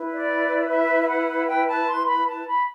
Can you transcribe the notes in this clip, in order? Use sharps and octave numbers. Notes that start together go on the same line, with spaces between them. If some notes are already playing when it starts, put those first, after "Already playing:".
Already playing: E4 B4
D5
E5
E5
F#5
G5
A5
B5
C6
B5
A5
B5